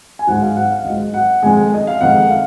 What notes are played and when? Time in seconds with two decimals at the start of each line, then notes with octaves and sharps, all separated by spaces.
0.19 G#5
0.27 G#1 G#2 F#3 F#5
0.42 F5
0.57 F#5
0.71 F5
0.85 G#1 G#2 F#3 D#5
1.14 F#5
1.42 F2 D#3 G#3 G#5
1.74 D#5
1.87 F5
2.01 F2 D#3 G#3 F#5
2.30 F5